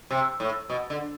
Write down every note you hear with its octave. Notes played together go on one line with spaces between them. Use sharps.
C3
A2
B2
D3